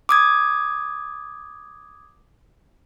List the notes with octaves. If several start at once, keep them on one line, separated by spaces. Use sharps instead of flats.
D6 D#6 G#6